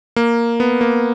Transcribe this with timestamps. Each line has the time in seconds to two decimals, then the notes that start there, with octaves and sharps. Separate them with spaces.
0.16 A#3
0.60 B3
0.81 A#3